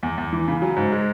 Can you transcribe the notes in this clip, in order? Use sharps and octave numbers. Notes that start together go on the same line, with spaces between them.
E2
E2
E3
C#3
F#3
G#2
G#3